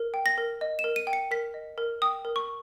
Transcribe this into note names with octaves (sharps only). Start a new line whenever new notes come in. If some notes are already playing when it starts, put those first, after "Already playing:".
Already playing: A#4
G5
A#6
A#4
D#5
E7
A#4
D#7
G5
C#7
A#4 B6
D#5
A#4
G5 D#6
A#4
C#6